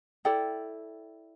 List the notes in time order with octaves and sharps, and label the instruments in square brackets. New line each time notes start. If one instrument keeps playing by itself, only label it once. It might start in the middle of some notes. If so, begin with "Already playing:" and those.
[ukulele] E4 A4 D5 G5